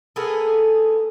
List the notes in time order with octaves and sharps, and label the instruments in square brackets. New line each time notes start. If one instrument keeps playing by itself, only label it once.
[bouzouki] A#3 B3 G#4 A4